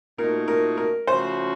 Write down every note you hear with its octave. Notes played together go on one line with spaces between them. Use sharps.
A#2 A3 D#4 F#4 A#4
A#4
A#4
C#3 F3 A3 C#4 F#4 C5